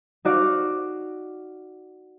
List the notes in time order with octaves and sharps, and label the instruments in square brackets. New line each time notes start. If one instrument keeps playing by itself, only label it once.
[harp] D#4 F#4 D5 F5